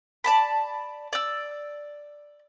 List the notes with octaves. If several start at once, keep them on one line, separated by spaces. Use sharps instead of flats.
D5 A5 B5
D5 E6